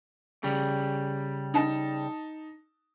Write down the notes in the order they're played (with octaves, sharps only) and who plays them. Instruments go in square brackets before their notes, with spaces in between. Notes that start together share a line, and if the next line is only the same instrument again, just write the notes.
[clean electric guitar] C#3 G3
[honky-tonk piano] D#4 A5